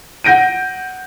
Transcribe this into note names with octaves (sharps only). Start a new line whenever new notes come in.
F#5 G6 A#6 D7 D#7